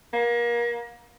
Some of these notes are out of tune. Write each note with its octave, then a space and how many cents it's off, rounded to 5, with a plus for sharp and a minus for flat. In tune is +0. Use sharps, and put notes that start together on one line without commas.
A#3 +30